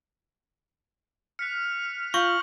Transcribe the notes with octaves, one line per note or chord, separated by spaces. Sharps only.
F6 F#6 B6 C#7
F4 C#6 G6 A#6 F#7